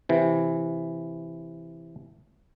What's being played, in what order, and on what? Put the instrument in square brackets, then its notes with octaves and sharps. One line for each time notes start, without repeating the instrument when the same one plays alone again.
[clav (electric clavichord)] C3 E3